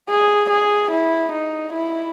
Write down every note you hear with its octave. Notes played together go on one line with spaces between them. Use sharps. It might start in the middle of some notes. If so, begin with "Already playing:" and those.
G#4
G#4
E4
D#4
E4